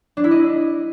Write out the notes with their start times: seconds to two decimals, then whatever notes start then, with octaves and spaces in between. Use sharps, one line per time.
0.17 D4
0.24 E4
0.31 D#5